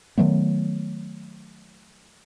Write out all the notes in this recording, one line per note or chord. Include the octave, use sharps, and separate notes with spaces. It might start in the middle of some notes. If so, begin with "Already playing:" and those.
D#3 F#3 A3 B3